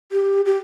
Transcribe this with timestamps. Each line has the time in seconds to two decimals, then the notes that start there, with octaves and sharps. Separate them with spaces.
0.12 G4
0.45 G4